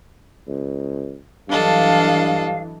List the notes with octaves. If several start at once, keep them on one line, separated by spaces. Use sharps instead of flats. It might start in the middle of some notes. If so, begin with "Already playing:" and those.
C#2
G2 E3 F#3 D4 A4 D#5 F5